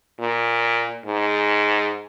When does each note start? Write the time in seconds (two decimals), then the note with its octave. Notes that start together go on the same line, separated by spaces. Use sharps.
0.20 A#2
1.06 G#2